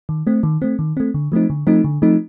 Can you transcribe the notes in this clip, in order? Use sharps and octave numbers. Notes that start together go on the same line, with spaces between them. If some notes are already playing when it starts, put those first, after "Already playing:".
D#3
A3 C4
D#3
A3 C4
D#3
A3 C4
D3
F3 A3 C4 D#4
D3
F3 A3 C4 D#4
D3
F3 A3 C4 D#4